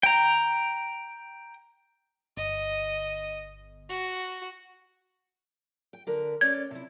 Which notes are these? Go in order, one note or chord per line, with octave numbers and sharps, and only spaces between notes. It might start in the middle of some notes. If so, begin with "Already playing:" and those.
G5 A#5
G1 D#5
F#4
G5
D3 A#4 B4
C#4 B4 D5 G#6
C3 E4